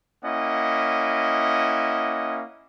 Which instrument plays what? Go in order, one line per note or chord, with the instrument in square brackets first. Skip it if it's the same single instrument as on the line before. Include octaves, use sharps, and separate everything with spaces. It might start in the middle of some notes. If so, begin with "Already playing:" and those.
[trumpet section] A#3 C#4 E4 D#5 F#5